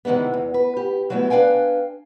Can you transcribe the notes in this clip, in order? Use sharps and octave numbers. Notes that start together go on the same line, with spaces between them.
C3 D#3 E3 G#3 B3
E2
B4
G4
F#3 G#3 A3 B3 E4
D4 B4 F5 G5 G#5